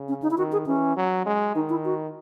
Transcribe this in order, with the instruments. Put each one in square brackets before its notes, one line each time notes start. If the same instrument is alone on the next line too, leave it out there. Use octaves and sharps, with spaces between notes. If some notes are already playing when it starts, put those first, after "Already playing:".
Already playing: [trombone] C#3
[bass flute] C#4
D#4
E4
[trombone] D#3 [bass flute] F#4
[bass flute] G#4
[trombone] E3 [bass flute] C#4
[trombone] F#3
G#3
[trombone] D#3 [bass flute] D#4
[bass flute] E4
F#4